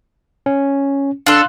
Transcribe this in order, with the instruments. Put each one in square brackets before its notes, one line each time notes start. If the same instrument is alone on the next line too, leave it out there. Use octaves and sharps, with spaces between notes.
[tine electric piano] C#4
[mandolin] D4 A4 [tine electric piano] F5 C6 F#6